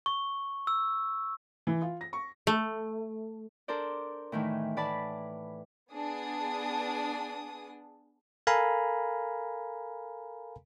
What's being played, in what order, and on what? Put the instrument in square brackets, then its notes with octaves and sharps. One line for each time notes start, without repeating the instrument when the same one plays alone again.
[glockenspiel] C#6
E6
[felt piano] E3
F4
A#6
C#6
[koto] A3
[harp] D4 A4 A#4 C5 D5
A2 D#3 E3 A3
A2 B4 D5 A5 B5
[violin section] B3 D4 G#4 D#6
[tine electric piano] A4 A#4 F5 G#5 A#5 B5